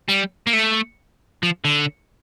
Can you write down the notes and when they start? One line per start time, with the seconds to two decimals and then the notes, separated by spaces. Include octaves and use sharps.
0.08 G3
0.47 A#3
0.53 A3
1.43 F3
1.65 D3